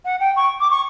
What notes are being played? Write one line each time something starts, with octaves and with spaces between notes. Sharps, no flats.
F#5
G5
C#6
D6
C#6